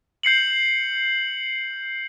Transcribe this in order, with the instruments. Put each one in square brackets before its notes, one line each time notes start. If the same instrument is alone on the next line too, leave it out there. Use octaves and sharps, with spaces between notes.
[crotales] G6 C7 C#7 F#7